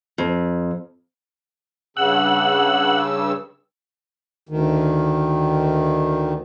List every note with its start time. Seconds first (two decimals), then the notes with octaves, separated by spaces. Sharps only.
0.18 F2
1.97 G2 C#3 F#5 E6
4.49 D2 D#3